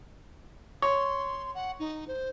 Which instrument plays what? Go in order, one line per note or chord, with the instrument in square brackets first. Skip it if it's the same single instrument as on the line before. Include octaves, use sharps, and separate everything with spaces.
[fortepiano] C#5 [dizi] C6
[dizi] F#5
D#4
C5